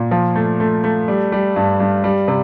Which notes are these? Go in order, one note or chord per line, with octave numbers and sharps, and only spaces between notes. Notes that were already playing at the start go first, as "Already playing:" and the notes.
Already playing: A#2
F3
A3
A3
A3
G3
G3
G2
G2
G3
C3